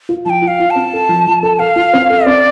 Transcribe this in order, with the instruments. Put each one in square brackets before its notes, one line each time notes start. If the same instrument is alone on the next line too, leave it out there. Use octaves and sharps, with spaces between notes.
[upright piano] F4
[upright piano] F3 [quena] G5 A5
[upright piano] F4
[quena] F5
[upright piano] F4
[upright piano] C4 [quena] A5
[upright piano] A4
F3
F3
A4
[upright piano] A4 [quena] F5
[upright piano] F4
C4
A4
[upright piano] C4 [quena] D5